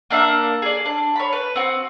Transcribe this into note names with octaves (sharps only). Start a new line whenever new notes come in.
A#3 D4 E5 F#5
G#4 D5
D4
C#5 B5
B4
C4 F#4